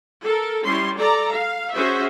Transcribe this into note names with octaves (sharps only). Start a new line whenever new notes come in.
A4 A#4
G3 C#4 E4 C6
A4 D5 A#5
F5
C#4 F#4 G#4 C5 E5